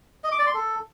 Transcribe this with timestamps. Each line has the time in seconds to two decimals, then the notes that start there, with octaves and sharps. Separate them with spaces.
0.24 D#5
0.32 D6
0.39 D5
0.47 C6
0.54 A4